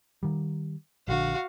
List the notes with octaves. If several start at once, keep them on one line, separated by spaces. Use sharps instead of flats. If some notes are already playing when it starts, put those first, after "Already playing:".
D#3 G3
A#1 D3 F#4 F5